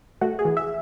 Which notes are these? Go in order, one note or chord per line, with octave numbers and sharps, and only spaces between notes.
A3 F#4
G#4
E3
E5